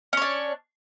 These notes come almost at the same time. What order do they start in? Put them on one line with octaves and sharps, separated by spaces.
C#4 C#5 D4